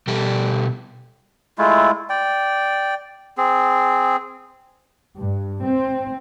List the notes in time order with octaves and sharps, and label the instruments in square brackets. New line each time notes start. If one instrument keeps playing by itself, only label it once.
[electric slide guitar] B2 G3 G4 A4
[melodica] G#3 A3 E4 F4
D5 G5
C4 G#4
[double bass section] G2
C4